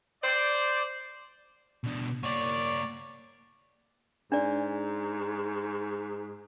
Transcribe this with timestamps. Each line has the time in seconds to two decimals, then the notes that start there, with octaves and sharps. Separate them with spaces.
0.23 C5 D5
1.84 B2 D4
2.23 A#3 F#4 C#5 D5
4.32 G#2 D4 D5